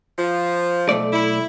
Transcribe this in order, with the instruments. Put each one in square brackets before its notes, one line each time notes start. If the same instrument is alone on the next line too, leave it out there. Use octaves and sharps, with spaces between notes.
[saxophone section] F3
[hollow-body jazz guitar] B1 A3 D5
[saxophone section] E4